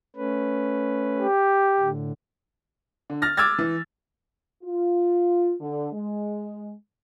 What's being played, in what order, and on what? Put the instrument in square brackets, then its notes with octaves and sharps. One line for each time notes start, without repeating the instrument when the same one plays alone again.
[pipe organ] A3 C#4 B4
[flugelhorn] G4
[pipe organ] A2 D3
[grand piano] D3
F6 A6 A#6
D6 E6 F6 G#6 A6
E3
[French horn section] F4
D3
G#3